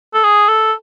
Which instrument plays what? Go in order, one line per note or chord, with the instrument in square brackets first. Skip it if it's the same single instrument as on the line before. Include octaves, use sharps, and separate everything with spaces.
[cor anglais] A4
G#4
A4